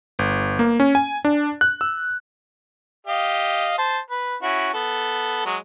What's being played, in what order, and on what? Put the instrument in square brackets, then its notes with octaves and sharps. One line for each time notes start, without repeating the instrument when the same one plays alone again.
[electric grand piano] G1
A#3
C#4
G#5
D4
F#6
E6
[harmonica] G4 D#5 F5
C5 A5
B4
C#4 E4 F#4
B3 A4
F#3 G#3